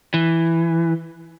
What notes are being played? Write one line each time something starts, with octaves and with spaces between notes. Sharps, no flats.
E3